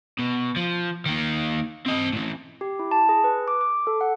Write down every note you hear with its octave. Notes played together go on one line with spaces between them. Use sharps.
B2
F3
D#3 A#3
C4 D#5
A2 E3
G4
E4
A5
G#4
B4
D6
D6
A4
F#5